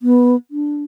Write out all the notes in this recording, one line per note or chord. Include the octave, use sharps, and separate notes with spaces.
B3
D4